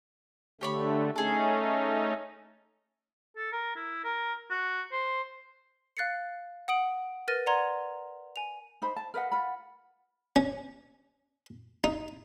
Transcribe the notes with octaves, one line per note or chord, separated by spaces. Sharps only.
D3 A3 G4 C#5 B5
A3 C#4 D#4 G#4 A4
A4
A#4
E4
A#4
F#4
C5
F5 F#6 A6 C7 C#7
F#5 D#6 D7 F#7
A#4 B4 F6 A6 A#6 D#7
D5 F#5 A#5 C6 G#6
G#5 F7
D#4 C5 B5
A5
A#4 B4 D#5 F#5
F4 F#5 B5
C#4
D#4